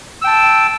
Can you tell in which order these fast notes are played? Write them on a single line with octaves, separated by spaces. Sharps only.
E6 G5 A5